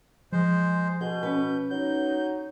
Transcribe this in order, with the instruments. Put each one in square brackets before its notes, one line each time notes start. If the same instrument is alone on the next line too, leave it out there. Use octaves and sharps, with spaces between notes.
[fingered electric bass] F3 [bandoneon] G#3 C5
[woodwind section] B2 [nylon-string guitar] G#4 [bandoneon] G6
[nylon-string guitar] C#4 B4
[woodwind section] F#3 D#4 [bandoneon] G6